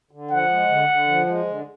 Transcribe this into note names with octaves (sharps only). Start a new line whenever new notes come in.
D3
F3 F#5
G#3
D3
D3
F3
G#3
D3